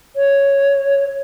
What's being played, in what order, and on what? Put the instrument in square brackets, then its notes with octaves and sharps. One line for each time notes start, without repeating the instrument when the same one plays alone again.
[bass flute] C#5